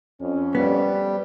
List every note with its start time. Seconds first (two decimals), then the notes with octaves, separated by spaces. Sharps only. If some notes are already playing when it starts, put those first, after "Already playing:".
0.20 F2 C#4
0.55 G3 B3